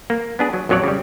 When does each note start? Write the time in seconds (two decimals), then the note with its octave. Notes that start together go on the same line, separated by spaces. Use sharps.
0.10 A#3
0.39 B3 D4 G#4
0.53 F#3
0.69 A#1 F2 F#3 C#5 D5
0.84 C#3 G3